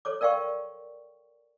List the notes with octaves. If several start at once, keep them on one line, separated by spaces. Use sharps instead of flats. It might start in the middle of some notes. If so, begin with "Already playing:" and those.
A4 C#5 D6
A#4 D5 F5 G5 C#6